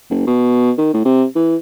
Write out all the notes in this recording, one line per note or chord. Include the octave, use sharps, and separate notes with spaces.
F#1
B2
D#3
A2
C3
E3